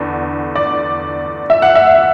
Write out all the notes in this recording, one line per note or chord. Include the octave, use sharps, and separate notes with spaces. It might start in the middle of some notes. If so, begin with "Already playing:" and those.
Already playing: E2 D3
D5
E5
F#5
E5